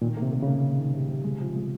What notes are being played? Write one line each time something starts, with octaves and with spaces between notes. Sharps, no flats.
A#2 D#3
A#3
C3
A#3
C#3 A#3
A#3
D#3
C3
C3
G#3
F3
G#3